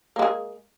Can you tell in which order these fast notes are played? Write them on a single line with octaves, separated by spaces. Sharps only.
A#3 G#3 G#4